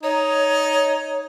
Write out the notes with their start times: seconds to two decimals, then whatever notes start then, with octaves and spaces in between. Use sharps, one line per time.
0.03 D#4 C#5